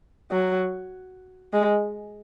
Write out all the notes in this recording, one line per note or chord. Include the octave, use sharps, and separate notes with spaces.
F#3
G#3